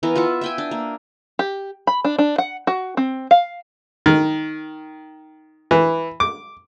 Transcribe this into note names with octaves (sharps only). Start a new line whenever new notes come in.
E3 B3 A#4
F4 B4 E5 F#5
E5 G5 G#5
D4
A#3
G4
B5
D4
D4
F#5
F#4
C4
F5
D#3
E3
D6